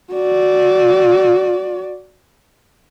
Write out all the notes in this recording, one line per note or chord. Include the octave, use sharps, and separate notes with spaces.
F#4 D5